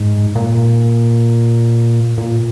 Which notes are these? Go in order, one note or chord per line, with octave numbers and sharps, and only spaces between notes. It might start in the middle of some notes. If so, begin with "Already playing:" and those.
Already playing: G#2
A#2
A#2